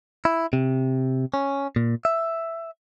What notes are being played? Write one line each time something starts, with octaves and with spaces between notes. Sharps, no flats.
E4
C3
C#4
A#2
E5